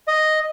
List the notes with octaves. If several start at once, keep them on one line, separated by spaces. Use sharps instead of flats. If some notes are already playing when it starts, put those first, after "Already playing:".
D#5